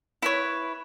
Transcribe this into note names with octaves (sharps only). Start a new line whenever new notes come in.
E4 B4 C#5